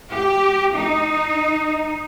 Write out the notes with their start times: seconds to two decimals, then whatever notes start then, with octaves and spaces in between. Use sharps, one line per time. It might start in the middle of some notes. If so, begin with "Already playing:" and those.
0.11 G4
0.73 D#4